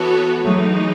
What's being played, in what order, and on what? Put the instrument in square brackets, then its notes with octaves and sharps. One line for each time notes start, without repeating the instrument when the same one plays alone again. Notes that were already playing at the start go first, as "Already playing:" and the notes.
Already playing: [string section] E3 B3 F#4 A4 C#5
[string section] E3 G#3 D#4 [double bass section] F#3 A3